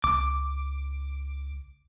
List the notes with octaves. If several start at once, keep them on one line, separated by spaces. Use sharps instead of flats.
C#2 D6